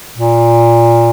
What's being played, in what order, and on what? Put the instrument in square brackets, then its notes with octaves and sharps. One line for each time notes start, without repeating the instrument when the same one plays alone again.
[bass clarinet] A#2